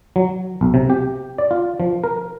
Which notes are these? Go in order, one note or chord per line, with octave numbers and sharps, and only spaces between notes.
F#3
B1
C3
G4
D5
F4
F3
A#4